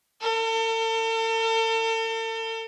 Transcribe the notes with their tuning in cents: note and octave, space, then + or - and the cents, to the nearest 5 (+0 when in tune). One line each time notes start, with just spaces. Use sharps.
A4 +40